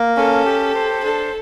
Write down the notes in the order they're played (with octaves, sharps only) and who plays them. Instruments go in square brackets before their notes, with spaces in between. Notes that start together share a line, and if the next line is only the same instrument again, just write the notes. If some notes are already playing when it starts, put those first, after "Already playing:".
Already playing: [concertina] A#3
[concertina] C#4 [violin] A4
[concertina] G4
C5
[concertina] D4 [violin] A4